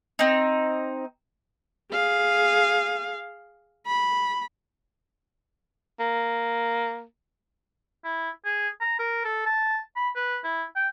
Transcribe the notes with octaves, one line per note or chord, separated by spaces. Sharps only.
C4 D#4
G#4 F5
B5
A#3
E4
G#4
A#5
A#4
A4
A5
B5
B4
E4
G5